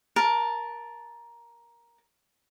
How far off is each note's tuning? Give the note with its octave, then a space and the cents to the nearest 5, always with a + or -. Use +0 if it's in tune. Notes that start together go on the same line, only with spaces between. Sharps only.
A#4 +10 A5 +0